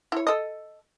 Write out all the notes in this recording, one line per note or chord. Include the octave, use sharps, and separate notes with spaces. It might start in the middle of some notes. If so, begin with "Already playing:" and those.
E4 C#5
A4 D#5